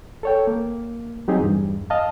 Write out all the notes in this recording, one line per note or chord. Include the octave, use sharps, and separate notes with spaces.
A4 C#5 G5
A#3
F#3 C4 D#4 G4 G#4
E2 G2
D#5 F5 A5